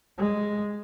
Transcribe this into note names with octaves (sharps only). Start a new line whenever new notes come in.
G#3